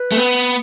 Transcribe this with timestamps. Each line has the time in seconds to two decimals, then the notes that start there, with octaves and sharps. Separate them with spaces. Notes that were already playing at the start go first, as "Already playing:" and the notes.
Already playing: B4
0.12 A3
0.17 B3